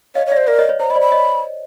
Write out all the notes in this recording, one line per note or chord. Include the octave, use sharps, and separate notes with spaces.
C#5 D#5 F5
C#5
D5 E5
C5
A#4 D5 E5
C#5 D#5
B4 C#5
C5 A#5
D#5 B5
C5 D5
B5
C#5 D#5